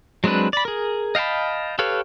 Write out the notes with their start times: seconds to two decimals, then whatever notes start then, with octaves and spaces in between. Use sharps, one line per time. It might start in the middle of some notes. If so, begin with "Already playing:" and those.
0.24 F#3 G#3 C4 D4 B4
0.53 D5 B5
0.65 G#4 A#4
1.15 D#5 F5 G5 A5 B5
1.79 G4 A4 B4 C#5 F5